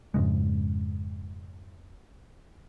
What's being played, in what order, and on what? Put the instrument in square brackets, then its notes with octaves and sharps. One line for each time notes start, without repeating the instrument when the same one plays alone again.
[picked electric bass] F2 G#2 C#3 G#3